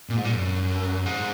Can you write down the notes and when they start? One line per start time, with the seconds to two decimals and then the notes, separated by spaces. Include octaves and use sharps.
0.10 A#2
0.17 G#2
0.25 A#2
0.34 F#2
1.06 G#2